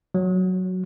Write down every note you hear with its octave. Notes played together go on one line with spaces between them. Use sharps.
F#3